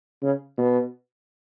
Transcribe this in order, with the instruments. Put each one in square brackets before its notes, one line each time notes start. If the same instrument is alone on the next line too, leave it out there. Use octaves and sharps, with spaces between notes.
[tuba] C#3
B2